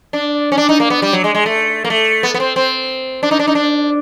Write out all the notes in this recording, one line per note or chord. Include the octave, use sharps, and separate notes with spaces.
D4
C#4
D4
D#4
A#3
B3
G3
F#3
G#3
G#3
A3
A#3
A3
B3
B3
C4
C4
D4
D#4
D4
D#4
D4